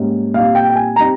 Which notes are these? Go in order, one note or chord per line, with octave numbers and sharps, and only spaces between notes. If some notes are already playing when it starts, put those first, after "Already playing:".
Already playing: G#2 G3 A#3 C#4
A#2 G3 C4 D#4 F5
G5
G5
G#5
G3 C4 D#4 A#5